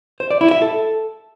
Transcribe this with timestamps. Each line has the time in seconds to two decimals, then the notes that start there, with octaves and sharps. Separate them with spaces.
0.20 C5
0.31 D5
0.41 E4
0.51 E5
0.62 A4